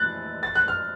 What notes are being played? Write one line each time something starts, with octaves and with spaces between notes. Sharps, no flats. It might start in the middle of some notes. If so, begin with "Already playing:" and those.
Already playing: F#6 A6
A6
F#6
F6